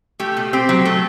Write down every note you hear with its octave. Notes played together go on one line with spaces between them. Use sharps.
A3 G4
B2
C4 G4
F#3
A3